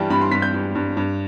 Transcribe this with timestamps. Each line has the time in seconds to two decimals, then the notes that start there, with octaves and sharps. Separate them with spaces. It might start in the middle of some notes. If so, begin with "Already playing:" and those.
Already playing: G2 E3 G3 G5 A5
0.10 G2 B5
0.21 C6
0.31 G2 B6
0.42 G6
0.54 G2
0.75 G2
0.97 G2